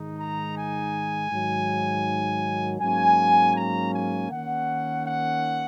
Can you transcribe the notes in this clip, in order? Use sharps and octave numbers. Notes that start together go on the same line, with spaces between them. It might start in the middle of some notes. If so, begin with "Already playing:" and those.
Already playing: G#2 D#3 G#3 D#4
A#5
G#5
G#2 D#3 F#3
G#2 F#3 A#3 C#4 G#5
A#5
G#5
D#3 A#3 C#4 F#5
F#5